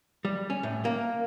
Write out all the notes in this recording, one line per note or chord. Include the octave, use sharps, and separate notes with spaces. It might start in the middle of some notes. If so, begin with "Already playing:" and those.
G3
C#4
A2
A#3